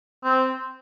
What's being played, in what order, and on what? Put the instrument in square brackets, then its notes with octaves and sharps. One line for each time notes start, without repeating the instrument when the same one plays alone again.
[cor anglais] C4